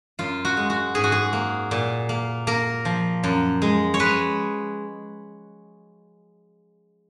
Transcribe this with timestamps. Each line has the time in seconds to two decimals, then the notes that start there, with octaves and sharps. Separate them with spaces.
0.19 F#2 F4
0.45 F#4
0.57 G#3
0.70 F#4
0.95 G#2 G#4
1.04 F#4
1.12 G#4
1.33 A#3
1.71 A#2
2.09 A#3
2.47 A#3 A#4
2.85 F3
3.24 F#2
3.62 G#3
3.94 C#5
3.99 G#3 B4